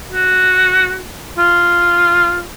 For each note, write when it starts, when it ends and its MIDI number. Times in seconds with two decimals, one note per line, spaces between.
0.12 0.98 66
1.38 2.43 65